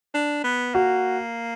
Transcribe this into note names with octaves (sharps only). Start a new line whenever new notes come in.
D4
B3
A#3 F#4